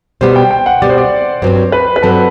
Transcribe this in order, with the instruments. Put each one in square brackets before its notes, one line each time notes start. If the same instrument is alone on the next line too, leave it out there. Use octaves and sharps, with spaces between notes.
[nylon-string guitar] B2 G3 B3 [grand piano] C5
[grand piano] G5
G5
F#5
[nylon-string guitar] B2 G3 B3 [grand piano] D5
[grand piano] C5
D5
[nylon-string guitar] G2 F#3 C4 [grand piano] C5
[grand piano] B4
B4
[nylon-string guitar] G2 F#3 C4 [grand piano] A4